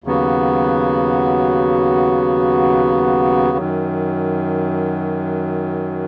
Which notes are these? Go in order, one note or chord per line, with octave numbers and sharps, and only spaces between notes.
D#2 C#3 F#3 B3 F#4
F#2 D#3 F#3